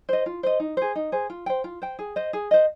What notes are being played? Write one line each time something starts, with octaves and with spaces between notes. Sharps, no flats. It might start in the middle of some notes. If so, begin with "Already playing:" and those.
C5 D#5
F4
C5 D#5
D#4
G#4 C5
D#4
G#4 C5
F4
C5 G5
F4
C5 G5
G#4
C5 D#5
G#4
C5 D#5